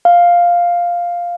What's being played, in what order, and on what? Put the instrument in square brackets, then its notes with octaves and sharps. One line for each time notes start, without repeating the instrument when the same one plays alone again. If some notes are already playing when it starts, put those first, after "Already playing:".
[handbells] F5